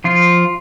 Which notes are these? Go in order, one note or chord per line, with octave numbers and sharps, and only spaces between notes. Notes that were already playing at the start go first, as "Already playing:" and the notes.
F3 F4